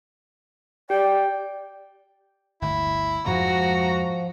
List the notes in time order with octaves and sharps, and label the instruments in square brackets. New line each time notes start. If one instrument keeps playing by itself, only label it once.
[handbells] G4 [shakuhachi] D5 [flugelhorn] G5
[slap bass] G1 D2 [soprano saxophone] E4
[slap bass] F2 G#2 G#3 [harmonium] F3 [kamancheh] F#4 [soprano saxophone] A#5